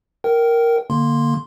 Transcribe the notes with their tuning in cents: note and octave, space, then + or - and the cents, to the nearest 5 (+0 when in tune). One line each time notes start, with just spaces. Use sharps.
A#4 +0 G5 -25
D3 +0 A#3 +0 C6 +0